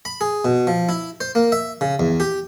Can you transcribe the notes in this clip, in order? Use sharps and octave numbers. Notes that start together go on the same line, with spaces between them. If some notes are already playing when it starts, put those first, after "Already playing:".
B5
G#4
B2
F3
E4
C5
A#3
E5
C#3
E2
G4